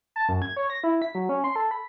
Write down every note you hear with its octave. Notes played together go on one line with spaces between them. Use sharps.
A5
F#2
G#6
C#5
A#6
E4
B6
F#3
C#4
C6
A4
B5